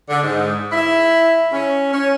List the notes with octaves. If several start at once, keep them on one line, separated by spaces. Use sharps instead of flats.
D3
G#2
E4
C#4
C#4